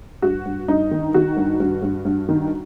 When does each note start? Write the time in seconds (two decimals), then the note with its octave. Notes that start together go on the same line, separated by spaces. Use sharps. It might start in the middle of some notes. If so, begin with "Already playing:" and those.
0.22 G2 F#4
0.45 G2
0.68 G2 D#4
0.91 D#3
1.14 D#3 F#4
1.37 G2
1.60 G2
1.82 G2
2.05 G2
2.29 D#3